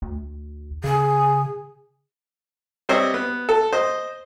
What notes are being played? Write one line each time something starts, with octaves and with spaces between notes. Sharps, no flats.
D2
C#3 G#4
G3 C4 C5 C#5 D#5 E5
B3
A4
C5 D#5